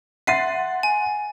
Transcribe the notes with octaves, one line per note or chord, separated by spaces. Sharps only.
E5 F#5 C6 A6 C7 D#7
G#5